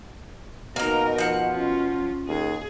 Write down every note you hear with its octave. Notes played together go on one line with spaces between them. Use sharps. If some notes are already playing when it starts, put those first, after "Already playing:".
B2 A#3 D#4 A#4 A#5
F3 F#5
C#4 F4
D#2 G#4